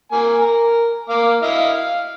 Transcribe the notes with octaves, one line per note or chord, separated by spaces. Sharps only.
A#3 G#5
A#4
A#3 F5 D6
E4 D#5 F5
F5